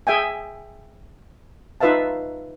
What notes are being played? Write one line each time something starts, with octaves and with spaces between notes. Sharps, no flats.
G#4 E5 G5 G#5
D#4 F4 B4 E5 F5 A5